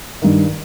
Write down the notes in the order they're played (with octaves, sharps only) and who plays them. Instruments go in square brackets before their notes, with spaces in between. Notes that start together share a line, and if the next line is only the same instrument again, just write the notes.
[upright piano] G2 D#3